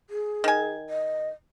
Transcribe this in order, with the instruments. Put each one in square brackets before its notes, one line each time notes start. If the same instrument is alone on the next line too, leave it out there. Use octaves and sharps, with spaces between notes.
[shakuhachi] G#4
[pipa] D#3 G#5
[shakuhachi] D#5